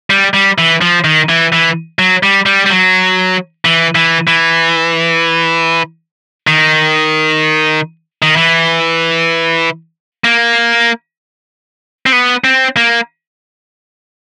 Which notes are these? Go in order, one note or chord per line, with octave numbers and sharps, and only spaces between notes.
G3
G3
E3
F3
D#3
E3
E3
F#3
G3
G3
G3
F#3
E3
E3
E3
D#3
D#3
E3
A#3
C4
B3
C4
A#3